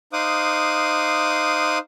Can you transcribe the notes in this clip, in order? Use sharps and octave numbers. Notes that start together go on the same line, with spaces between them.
D#4 C5 F5 D6 D#6 F#6